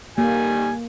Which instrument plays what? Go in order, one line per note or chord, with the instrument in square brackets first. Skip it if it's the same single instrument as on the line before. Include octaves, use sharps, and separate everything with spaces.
[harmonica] D#3 G3 G#5 [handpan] A#3